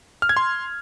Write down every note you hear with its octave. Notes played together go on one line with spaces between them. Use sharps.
F6
G#6
C6